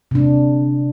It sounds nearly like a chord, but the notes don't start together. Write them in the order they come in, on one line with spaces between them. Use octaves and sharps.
C3 D4 G#3